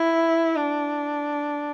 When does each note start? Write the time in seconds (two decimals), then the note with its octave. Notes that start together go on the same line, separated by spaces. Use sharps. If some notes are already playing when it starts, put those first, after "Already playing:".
Already playing: E4
0.56 D4